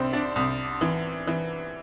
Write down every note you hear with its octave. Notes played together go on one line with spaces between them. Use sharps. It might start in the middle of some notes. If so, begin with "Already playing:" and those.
Already playing: C2 C4 D4 C5 E5
D4 D5
C2
E3
E3